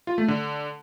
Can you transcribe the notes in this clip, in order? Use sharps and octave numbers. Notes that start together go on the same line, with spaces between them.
F4
A3
D3